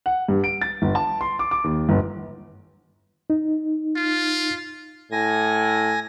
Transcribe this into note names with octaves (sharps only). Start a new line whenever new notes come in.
F#5
G2
D7
A6
G1
A5
C6
D6
D6
D#2
G1
D#4
F4
A2 G#5 A#6